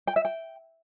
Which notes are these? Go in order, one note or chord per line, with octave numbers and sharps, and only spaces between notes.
G5
E5
G5